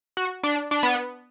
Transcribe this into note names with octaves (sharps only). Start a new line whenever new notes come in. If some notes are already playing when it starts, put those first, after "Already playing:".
F#4
D4
D4
B3